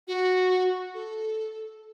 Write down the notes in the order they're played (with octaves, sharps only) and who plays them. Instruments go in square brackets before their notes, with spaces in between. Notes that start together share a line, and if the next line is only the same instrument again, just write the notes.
[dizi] F#4
A4